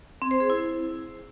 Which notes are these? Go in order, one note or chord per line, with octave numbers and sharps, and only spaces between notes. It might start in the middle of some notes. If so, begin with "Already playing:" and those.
C4
C5
G#4
E4